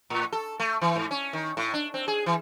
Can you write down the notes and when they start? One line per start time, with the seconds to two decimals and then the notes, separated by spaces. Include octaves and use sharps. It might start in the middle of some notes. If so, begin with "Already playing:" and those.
0.10 A2
0.33 A4
0.60 A3
0.82 E3
0.96 G#2
1.11 C#4
1.33 D#3
1.57 A2
1.74 D4
1.94 C4
2.08 G#4
2.26 E3